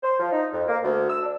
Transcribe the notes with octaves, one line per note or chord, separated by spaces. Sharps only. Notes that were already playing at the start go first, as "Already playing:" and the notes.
C5
F3
D#4
F2
A#3
D2
E6
D4